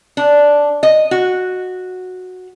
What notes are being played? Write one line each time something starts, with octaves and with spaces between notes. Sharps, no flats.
D4
D#5
F#4